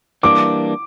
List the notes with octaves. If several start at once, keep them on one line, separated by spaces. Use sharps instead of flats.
E3 G3 A#3 D4 D6